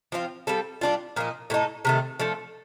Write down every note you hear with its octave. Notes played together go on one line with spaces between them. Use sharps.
F3 C4 F4
G3 C4 F4 A4
G3 D4 F4
A#2 F3 A#3 D#4
A2 A3 D#4 A4
C3 D#3 A3
F3 A3 D4 A4